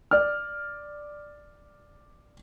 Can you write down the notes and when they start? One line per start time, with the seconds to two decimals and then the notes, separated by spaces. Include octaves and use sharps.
0.11 D5 F6